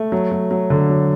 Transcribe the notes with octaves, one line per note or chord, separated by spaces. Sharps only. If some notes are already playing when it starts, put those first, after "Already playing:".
Already playing: A3
F#3
F#3
F#3
D3
F#3